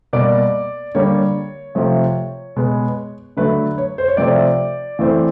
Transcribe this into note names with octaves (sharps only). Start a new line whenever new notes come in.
B2 G3 A#3 D5
D3 G3 A#3 C#5
C3 F3 A3
B2 G#3 B3
D3 F#3 A3 B4
C#5
C5
C#5
C3 F3 A3 C4 D5
E3 A3 C4